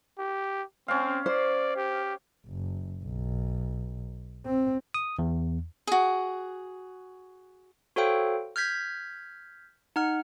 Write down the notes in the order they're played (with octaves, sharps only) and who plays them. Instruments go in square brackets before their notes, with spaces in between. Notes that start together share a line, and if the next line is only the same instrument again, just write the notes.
[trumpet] G4
[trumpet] C4 [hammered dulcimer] C#4 F5
[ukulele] C5 [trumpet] D5
[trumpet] G4
[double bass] F#1
B1
C4
[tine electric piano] D#6
E2
[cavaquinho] F#4 G#4
[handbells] F#4 A4 C5 C#5 F5 G5
F6 G6 G#6 B6
D#4 F#5 F6